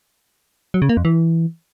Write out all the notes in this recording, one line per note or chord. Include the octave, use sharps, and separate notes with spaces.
F#3
C#3
A#3
F2
E3